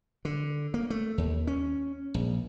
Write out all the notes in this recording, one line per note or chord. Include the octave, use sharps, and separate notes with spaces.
D3
A#3
A3
D#2
C#4
A#1